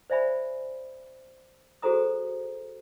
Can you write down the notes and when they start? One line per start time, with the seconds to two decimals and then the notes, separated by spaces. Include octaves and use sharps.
0.10 C5 D5 E5 G#5 B5
1.82 F#4 G#4 A4 C5 A#5 D#6